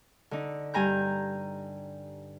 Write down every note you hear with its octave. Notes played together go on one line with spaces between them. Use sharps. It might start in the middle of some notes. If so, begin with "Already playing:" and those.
D3 D#4
G2 G#5 A#5 G6